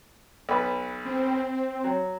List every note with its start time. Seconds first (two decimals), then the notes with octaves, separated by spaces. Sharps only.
0.49 B1 B4
1.05 C4
1.84 F#3